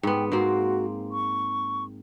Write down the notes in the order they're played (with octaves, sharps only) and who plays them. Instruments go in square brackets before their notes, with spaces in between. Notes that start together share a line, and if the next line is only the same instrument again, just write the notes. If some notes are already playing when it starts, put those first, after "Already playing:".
[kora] G#2 B3 [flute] G5
[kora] G#2 A#3 C4 [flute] F#4
[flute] C#6